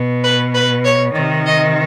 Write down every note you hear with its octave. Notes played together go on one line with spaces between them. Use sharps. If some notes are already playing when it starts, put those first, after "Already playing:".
Already playing: B2
B4
B4
C#5
D#3 D5
C3
D#5